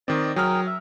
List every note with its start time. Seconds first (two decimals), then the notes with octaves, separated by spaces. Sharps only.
0.08 D#3 C4 D5 D#5
0.36 F#3 G#4 A#4 G5 F6
0.67 E5